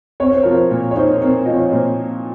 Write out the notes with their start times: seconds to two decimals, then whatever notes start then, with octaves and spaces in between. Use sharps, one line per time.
0.20 C4 C#5
0.31 C5
0.43 F3 A#4
0.54 C5
0.71 A#2
0.91 C#5
0.96 D#4 C5
1.15 A#4
1.22 C4
1.45 F3 D#5
1.54 C#5
1.72 A#2 C5